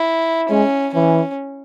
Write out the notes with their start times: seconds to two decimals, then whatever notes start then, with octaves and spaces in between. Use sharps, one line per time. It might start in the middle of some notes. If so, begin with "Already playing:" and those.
Already playing: E4
0.50 G#3 C#4
0.94 E3 C#4